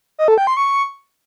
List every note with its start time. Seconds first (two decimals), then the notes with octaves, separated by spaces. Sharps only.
0.19 D#5
0.28 A4
0.38 G5
0.47 C6
0.57 C#6